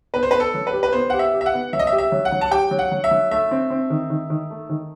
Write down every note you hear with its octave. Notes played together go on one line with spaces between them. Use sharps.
B3 B4
C5
B3 B4
A4
F#3
B4
G4
B4
B3 C5
G4 F#5
E5
G4
E5
F#5
B3
F#3 E5
D#5
E5
G4
E5
F#3
F#5
F#3
A5
G4 G5
F#3
F#5
F#3
E5
F#3
A3 E5
C4
C4
D#3
D#3
D#3
A3
D#3